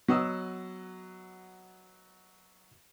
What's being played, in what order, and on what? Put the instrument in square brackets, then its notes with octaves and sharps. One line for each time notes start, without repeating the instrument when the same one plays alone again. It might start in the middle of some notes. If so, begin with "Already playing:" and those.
[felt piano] F#3 B3 D#5 F#5 D#6 E6